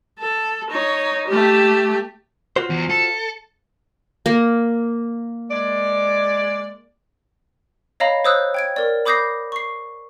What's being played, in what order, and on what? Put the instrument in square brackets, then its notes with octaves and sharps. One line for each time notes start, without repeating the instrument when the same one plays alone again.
[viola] A4
D#4 C#5
A3 G4
[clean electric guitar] F4 F#4 C5
[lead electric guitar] E2
A4
[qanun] A#3
[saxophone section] G#3 D5
[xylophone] C#5 D#5 F5 A#5 B5
C5 C#5 D#6 E6 F#6 G6
G5 G#6 D7
A#4 D5
B5 D6 D#6 G6 A#6 C7
C#6 C7